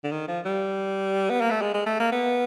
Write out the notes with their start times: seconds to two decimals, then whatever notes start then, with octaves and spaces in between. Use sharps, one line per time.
0.04 D3
0.11 D#3
0.28 F3
0.45 G3
1.30 B3
1.41 A#3
1.51 A3
1.61 G#3
1.74 G#3
1.86 A3
2.00 A#3
2.12 B3